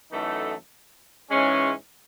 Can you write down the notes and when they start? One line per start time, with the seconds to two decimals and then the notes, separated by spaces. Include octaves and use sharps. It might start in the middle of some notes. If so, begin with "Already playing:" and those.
0.12 F#2 E3 A3 D#4 A4
1.31 G#2 E3 G#3 C#4